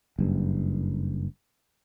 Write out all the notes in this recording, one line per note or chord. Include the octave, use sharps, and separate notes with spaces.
F#1 G2